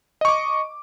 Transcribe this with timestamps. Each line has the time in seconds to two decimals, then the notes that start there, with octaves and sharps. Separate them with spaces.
0.21 D#5
0.25 C#6
0.28 D6